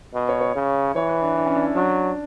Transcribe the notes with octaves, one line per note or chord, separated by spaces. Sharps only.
B2
C#5
C#5
C#3
E3 C#5
B4
D4
D4
C#4
D4
E4
F#3 D4